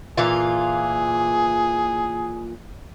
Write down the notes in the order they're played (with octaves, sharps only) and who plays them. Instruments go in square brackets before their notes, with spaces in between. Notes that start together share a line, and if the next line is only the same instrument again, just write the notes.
[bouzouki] A#2 E3 F4 [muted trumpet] G#4